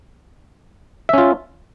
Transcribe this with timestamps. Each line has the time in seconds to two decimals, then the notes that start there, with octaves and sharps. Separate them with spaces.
1.09 E5
1.13 C#4
1.18 F4